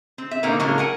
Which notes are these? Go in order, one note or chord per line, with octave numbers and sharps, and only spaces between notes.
C4
E5
B2 D3 A#3 C4 D#4
A2 C#3 F#3 G#3 A#3
A#4 F#5 G#5